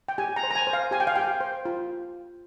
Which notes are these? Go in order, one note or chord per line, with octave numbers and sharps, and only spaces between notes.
G5
G4 G#5
A#5
C5
A#5
G#5
C5
F5
G4 G#5
G5
F5
G4 G5
C5
F4